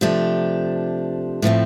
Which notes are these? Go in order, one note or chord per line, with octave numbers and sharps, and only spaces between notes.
C3 F3 A3 D4 G4
A2 F3 A3 C4